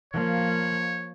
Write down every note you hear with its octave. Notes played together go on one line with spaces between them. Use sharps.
F3 A#3 C#5